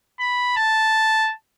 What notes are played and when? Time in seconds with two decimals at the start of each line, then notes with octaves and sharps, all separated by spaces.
0.20 B5
0.57 A5